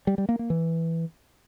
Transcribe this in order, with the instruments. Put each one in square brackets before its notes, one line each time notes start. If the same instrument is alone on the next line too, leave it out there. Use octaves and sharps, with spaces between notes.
[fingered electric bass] G3
G3
A#3
A#3
E3